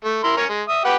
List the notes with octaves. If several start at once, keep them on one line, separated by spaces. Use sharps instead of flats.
A3
E4 A#4 C6
C#4 A#4 C#5
G#3
E5 D#6
G4 B4 F#5